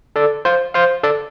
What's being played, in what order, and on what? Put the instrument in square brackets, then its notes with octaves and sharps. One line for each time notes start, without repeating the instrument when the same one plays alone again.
[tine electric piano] A4 D5
C5 F5
C5 F5
A4 D5